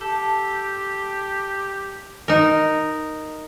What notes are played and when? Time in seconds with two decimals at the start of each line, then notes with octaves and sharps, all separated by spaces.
0.01 G4 A4
2.28 D#4 A#4